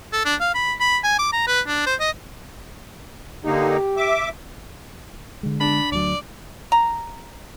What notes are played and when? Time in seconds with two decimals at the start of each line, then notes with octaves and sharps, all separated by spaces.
0.13 A4
0.25 D4
0.40 F5
0.55 B5
0.80 B5
1.04 G#5
1.19 D6
1.33 A#5
1.47 B4
1.67 D4
1.86 C5
2.00 D#5
3.45 D3 A#3 D#4 G4
3.97 E5 D6
5.43 D3 G#3
5.61 D4 B5
5.92 D2 F#3 D5
6.72 A#5